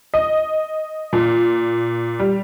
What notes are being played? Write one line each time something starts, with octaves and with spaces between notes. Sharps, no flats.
D#5
A#2
G3